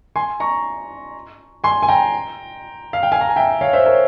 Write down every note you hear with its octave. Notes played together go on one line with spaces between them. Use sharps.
G#5 C6
A#5 C#6
G#5 C6
G#5
G5 A#5
F5
G5
F5 G#5
A#5
G#5
E5 G5
C#5 F5
C5 E5
A#4 C#5